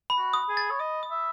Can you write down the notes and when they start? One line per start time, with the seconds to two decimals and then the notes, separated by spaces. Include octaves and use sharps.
0.10 B5
0.18 F#4
0.34 D#6
0.49 G#4
0.57 A6
0.70 C#5
0.80 D#5 D#6
1.03 D#6
1.11 E5